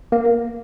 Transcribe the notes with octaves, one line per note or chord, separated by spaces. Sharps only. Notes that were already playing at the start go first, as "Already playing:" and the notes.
A#3